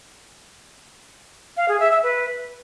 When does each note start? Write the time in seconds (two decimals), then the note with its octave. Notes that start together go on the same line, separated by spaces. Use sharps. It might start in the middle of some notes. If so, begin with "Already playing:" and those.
1.57 F5
1.68 G#4
1.80 E5
1.92 E5
2.03 B4